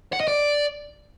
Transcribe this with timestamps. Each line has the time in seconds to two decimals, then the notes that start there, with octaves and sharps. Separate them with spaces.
0.13 F#5
0.20 D#5
0.28 D5